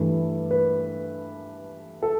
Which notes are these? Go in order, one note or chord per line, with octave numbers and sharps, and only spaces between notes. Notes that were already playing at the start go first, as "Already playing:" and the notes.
Already playing: G2 E3 A3
B4
A4